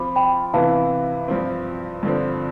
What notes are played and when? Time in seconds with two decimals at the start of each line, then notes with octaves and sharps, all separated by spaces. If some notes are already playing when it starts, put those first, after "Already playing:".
Already playing: F3 C4 F4 B5 D6
0.16 G5 B5
0.53 C3 E3 B3 E4 B4 F5 A5
1.28 G2 F3 C4
2.03 G2 D3 F3 C4